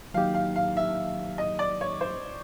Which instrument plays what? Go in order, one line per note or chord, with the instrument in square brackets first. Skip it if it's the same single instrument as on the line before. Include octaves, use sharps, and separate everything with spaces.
[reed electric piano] D#3 F#3 A#3 D#4 G4 [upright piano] F5
[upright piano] F5
F5
E5
D#5
D5
C#5
C5